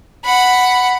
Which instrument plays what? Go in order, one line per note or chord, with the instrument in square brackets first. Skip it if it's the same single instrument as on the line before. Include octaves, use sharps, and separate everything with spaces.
[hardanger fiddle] F#5 B5